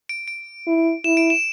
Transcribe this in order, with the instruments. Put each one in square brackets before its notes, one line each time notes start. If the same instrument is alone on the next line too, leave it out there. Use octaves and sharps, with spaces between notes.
[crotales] D7
D7
[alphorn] E4
[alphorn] E4 [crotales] E7
[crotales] D7
E7